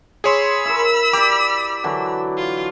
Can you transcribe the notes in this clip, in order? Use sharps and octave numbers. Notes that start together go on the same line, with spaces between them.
G#4 C#5 B5 C6 E6
E4 A#4
G4 D5 D6
D3 E3 F#3
F4